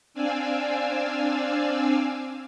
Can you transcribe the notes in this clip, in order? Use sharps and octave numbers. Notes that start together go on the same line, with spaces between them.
C4 D4 D5 F5 G#5 E6